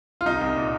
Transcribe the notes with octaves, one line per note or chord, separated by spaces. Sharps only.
F4
C2 D#4
C2
A#2